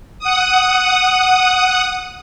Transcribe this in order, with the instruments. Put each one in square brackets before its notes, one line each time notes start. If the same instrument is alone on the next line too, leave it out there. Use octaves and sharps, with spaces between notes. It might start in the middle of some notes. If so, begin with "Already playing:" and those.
[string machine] F#5 D#6